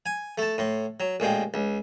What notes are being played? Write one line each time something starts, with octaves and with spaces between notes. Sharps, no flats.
G#5
A3 A5
A2 C6
F#3
A1 A#2 G#3 G5
C#2